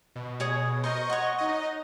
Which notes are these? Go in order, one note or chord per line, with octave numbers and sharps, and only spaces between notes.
B2
G#4 C#5 D#6
A#4 C5 D#5 C#6
C#5 F#5
D#4 D#5